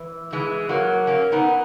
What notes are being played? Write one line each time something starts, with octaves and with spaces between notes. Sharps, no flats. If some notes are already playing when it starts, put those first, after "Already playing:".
Already playing: E3
E3 G#3
F#3 A#3
A#3 C#4
B3 D#4